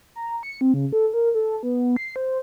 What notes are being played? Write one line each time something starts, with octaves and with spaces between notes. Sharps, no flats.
A#5
C#7
C4
C#3
A4
A#4
A4
B3
C7
C5